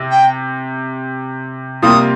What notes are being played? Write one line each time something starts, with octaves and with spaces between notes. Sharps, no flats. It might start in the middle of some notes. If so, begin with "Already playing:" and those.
Already playing: C3
G5
C3 G3 A#3 F4 D#6